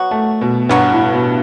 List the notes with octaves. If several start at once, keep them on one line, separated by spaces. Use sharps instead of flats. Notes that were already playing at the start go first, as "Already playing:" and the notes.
Already playing: F#3 B3 F#4
A3
B2
G2 F#3 B3 F#4
A2
B2